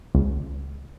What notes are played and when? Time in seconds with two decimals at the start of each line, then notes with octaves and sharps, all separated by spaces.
0.15 C#2